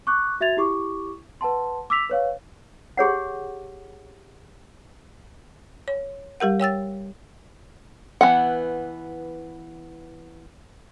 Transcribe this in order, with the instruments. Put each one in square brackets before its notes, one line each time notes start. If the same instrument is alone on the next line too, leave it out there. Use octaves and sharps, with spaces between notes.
[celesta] C#6 D6 F#6
F#4 E5 G#6 A6 F7
E4 G4 C#6 D6
B4 F#5 A5 C6
D6 E6 B6 F7
B4 C#5 F5
[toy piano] G4 G#4 C#5 F#5
[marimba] C#5
G3 G4 A#4 F#5
C#5 G5 E6 A6
[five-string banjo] E3 B3 F#5